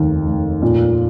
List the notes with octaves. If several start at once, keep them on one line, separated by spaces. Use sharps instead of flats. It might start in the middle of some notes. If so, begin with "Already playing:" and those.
Already playing: F1 D#2 D#3
F1
A#2